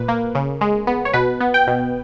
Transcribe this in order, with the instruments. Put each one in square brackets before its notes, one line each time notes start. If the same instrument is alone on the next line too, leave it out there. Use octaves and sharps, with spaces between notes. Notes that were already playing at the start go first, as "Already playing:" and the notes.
Already playing: [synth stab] A#2 B4
A#3
C#3
G#3
B3
C#5
B2 B4
B3
G5
B2